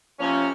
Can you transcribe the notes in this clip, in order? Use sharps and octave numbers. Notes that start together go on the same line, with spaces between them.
C3 F3 A#3 C#4